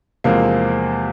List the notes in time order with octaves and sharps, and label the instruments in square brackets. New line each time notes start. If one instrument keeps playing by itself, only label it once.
[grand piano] E2 C3 F3 G#3 C4 [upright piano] A#3